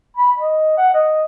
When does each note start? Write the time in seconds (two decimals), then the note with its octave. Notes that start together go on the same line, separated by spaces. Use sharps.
0.17 B5
0.37 D#5
0.77 F#5
0.93 D#5